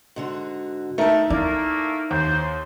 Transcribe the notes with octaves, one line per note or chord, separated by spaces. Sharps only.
G#2 D3 F#4
A3 D#4 A#4 E5 A5
A3 A#3 E4 D5
D#2 C5